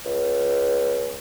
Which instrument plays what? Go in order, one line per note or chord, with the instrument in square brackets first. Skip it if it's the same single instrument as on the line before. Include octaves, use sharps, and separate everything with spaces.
[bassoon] C#2